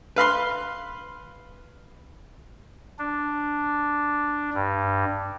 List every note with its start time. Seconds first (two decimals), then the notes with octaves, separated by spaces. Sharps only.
0.16 B4 F5 B5 C6
2.98 D4
4.54 G2